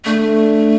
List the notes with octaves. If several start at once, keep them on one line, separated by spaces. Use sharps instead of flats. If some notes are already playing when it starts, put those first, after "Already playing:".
D3 A3